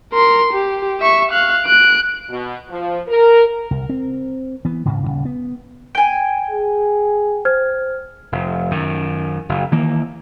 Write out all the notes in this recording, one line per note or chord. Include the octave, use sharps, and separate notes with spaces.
A#4 C6
G4
E5 C#6
F5 F#6
F#6 D7
B2
F3
A#4
C2
C4
E3 B3
D2 G#2 C#3
D#1 E2 C#3
B3
G5 G#5 D7
G#4
C5 F6 G#6
F1
F#2 D#3
F#1
D#3 E3 A#3